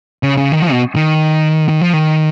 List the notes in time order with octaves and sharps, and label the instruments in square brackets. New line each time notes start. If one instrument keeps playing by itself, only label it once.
[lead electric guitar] C#3
C#3
D#3
F3
B2
D#3
D#3
F3
D#3